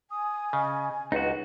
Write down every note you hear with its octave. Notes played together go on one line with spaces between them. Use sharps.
G#5 D#6
C#3 D#5
C#2 D#4 F#4 B4